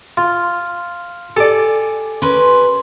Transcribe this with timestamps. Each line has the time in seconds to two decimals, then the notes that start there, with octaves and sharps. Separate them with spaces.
0.17 F4
1.37 G4 A4 D5 G#5
2.22 C#4 A#4 B4 C6